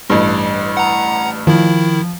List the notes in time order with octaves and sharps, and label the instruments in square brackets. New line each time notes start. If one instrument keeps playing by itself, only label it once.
[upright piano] A1 G2
[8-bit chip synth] F#5 A#5
[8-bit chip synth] D#3 E4 [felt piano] F3